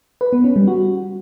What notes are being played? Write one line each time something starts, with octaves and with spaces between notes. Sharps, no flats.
B4
B3
C#4
G3
F#4